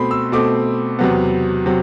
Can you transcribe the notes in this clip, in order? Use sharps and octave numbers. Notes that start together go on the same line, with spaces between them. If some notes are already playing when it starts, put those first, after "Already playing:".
Already playing: B2 A3 C4 B5 C6
E6
B2 A3 C4 D6
E2 C3 F#3 B3
C3 F#3